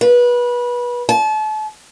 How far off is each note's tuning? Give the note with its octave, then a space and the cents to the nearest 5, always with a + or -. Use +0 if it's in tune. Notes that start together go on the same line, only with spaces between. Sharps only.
B4 -25
A5 -35